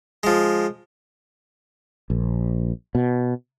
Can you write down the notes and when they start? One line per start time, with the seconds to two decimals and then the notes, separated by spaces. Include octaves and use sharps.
0.23 F3 G#3
2.10 A#1
2.95 B2